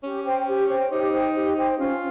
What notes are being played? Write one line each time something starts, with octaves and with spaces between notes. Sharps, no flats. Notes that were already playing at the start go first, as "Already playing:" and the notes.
C#4 G4
C5 G5
G4
C5 G5
D#4 G4
C5 G5
G4
C5 G5
C#4 F4